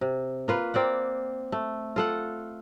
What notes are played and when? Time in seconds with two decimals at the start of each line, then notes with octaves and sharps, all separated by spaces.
0.01 C3
0.48 A#3 F4 B4
0.74 A#3 C4 D5 F#5
1.52 A3
1.96 F4 A4 F#5